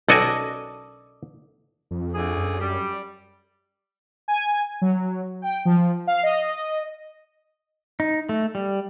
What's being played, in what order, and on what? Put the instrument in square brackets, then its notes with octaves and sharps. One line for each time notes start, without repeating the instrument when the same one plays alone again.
[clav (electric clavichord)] B1 F#4 G#5 [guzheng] A4 D5 D#5
[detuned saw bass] F2
[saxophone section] D2 G#4
[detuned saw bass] F#2
[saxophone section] G3
[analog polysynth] G#5
F#3
G5
F3
F5
D#5
[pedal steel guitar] D#4
A3
G3